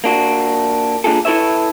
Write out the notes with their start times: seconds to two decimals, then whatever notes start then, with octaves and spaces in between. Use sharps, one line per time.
0.04 A#3 D4 F#4
1.04 A#3 D4 F4 G#4 A4
1.25 E4 A4 B4 C#5 E5